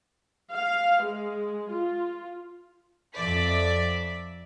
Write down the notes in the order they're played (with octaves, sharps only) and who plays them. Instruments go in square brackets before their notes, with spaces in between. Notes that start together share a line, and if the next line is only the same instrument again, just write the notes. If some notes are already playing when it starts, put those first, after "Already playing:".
[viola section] F5
G#3
F4
[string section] F2 D5 E5 B6